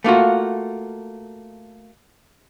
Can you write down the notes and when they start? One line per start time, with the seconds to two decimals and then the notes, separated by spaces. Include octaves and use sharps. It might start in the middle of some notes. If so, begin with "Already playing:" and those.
0.04 A3 A#3 F4 F#4